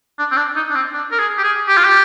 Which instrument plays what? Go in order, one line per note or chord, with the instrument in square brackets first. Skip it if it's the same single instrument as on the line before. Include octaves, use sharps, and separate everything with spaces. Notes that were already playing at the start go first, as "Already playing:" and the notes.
[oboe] D4
C4
D4
D#4
D4
C4
D4
A#4
G#4
G4
G#4
G4
F4
G4